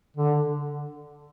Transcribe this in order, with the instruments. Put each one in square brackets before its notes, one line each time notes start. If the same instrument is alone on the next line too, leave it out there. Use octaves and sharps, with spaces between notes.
[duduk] D3